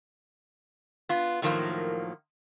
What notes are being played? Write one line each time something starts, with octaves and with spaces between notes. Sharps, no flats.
B3 F4
A2 D#3 F3 F#3 A#3